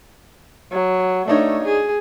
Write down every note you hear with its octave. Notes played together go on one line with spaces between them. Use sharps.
F#3
A3 D4 D#4 C#5
G#4